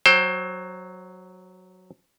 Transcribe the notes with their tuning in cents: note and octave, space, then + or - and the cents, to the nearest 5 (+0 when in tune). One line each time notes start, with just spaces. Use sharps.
F#3 +0 C5 +25 G5 +0